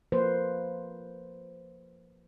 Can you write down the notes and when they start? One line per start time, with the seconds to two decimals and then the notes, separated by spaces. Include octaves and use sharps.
0.12 F3 A#3 B4 C5